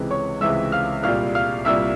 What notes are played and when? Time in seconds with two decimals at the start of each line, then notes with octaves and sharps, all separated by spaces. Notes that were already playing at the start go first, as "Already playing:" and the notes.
Already playing: C#2 C3 E3 G#3
0.11 C#5 C#6
0.41 C#2 C3 E3 G#3 E5 E6
0.72 F5 F6
1.03 C2 A#2 G3 F5 F6
1.35 F5 F6
1.65 C2 A#2 G3 E5 E6